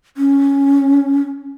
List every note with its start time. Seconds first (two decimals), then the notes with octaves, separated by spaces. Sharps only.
0.17 C#4